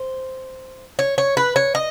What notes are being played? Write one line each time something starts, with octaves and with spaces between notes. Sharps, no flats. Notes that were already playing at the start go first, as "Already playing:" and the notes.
Already playing: C5
C#5
C#5
B4
C#5
D#5